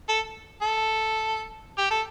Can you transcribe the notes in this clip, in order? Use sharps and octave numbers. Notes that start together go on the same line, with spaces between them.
A4
A4
G4
A4